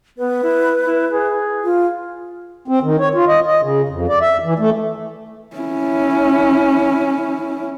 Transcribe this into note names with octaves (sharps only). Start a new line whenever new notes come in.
B3 B4
E4
E4
G#4
F4
C4
D#3
C#5
F4
D#5
D#5
C#3
F2
D5
E5
E3
A3
C#4 E4